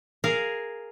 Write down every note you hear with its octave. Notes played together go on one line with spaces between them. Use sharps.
G#4 A#4 F5